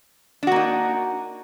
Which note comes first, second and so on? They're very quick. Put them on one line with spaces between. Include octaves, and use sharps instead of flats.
D4 F#4 A#3 D#4